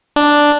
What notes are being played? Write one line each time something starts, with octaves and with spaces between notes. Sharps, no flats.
D4